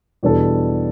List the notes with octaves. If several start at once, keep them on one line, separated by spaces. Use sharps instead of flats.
E2 B2 G3 D4 A4